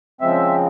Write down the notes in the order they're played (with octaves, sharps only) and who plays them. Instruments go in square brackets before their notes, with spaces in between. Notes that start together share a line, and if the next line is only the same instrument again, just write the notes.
[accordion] C#3 F3 G#3 C4 E5